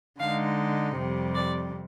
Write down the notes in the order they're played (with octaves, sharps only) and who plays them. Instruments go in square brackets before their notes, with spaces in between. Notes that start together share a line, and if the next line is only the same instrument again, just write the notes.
[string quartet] D3 G#3 D#4 F5
F2 C3 G3
D5